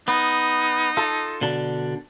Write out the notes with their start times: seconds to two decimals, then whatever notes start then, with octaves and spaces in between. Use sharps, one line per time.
0.08 B3 D#4
0.97 F4 A4
1.41 B2 D3 D4